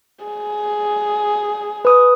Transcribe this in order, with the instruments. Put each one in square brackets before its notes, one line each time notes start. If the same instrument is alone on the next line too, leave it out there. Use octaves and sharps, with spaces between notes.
[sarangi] G#4
[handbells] B4 D#6